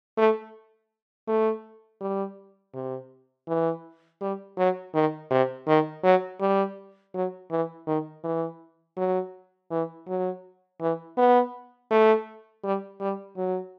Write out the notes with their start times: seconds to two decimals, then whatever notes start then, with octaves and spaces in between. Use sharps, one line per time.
0.18 A3
1.28 A3
2.01 G3
2.74 C3
3.48 E3
4.21 G3
4.58 F#3
4.94 D#3
5.31 C3
5.68 D#3
6.04 F#3
6.41 G3
7.14 F#3
7.51 E3
7.87 D#3
8.24 E3
8.97 F#3
9.71 E3
10.07 F#3
10.80 E3
11.18 B3
11.91 A3
12.64 G3
13.01 G3
13.37 F#3